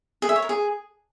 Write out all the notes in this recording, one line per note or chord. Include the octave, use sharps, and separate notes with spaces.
G#4
E5
C#5
A#4
G#4